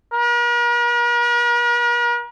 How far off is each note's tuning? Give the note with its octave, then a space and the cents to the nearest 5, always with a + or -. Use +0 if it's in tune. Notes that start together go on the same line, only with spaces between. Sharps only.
A#4 +45